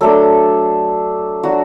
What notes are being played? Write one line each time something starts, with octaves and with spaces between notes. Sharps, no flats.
F#3 A3 D4 A4
F#3 D4 F#4